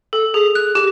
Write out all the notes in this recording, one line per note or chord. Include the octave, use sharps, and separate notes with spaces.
A4
G#4
F#6
G4